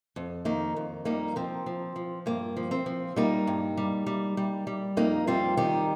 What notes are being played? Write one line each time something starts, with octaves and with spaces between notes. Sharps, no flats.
F2
D#3 A#3 D#4
F2
G3 A#3 D#4
F3 C4
F3
F3
G2 A#3
F3
C4
F3
G3 A#3 D#4
G2
G3
G3
G3
G3
F2 A#3 D#4
G3 C4 F4
D#3 D#4 G4